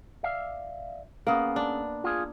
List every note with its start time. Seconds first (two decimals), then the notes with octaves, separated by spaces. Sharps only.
0.23 D5 E5 F5
1.27 A#3 B3 C#4 G#4
1.56 D4
2.04 F4 G#4